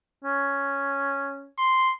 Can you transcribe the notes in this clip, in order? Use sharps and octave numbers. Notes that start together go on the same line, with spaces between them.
C#4
C6